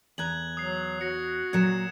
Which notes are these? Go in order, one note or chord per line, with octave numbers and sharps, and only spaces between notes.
E2 A#5 F#6 G#6 F#7
F#3 D#6 C7
F#4 A#6 C#7
A#2 F#3 G#6 C#7 E7